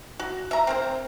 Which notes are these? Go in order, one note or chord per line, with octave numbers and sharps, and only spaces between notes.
F#4
E5 A#5
C4 A#4 C5